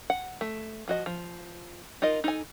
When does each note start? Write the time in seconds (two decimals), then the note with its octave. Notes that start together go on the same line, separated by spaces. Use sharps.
0.10 F#5
0.41 A3
0.88 F3 F#4 D#5
1.06 F3
2.02 D#4 F4 A#4 D#5
2.24 D#4 A4 G#5